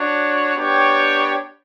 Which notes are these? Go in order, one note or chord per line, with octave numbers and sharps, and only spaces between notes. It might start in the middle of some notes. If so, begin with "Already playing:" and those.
Already playing: D4 F#4 C#5
B3 D4 G4 C#5 G5